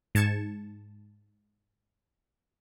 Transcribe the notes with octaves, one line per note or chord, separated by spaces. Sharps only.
G#2 A5 G#6 C#7 E7